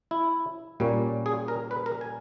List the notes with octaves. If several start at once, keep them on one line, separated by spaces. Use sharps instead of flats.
E4
A#2 G3 A#3 C#4
G#4
A#4
B4
A#4
G#5